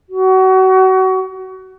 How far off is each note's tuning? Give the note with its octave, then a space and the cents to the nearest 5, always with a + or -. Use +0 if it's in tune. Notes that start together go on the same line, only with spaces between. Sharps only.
F#4 +30